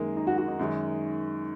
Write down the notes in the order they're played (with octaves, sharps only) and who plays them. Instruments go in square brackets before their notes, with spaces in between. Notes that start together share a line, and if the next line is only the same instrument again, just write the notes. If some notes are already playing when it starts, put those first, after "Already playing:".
Already playing: [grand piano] F#2 D#3 G#3 [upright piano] A#3
[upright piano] D#4
F#4
F#4
D#4
[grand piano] F#2 D#3 G#3